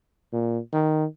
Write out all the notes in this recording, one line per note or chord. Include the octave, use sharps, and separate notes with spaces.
A#2
D#3